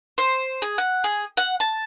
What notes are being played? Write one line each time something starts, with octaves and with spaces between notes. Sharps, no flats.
C5
G#4
F#5
G#4
F#5
A5